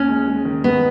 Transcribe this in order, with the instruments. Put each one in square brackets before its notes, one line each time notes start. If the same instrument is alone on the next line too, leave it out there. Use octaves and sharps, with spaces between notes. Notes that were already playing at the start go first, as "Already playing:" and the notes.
Already playing: [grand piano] D#2 [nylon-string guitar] C#4
[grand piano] G#3
G#3
D#3
[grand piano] D#3 [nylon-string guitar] B3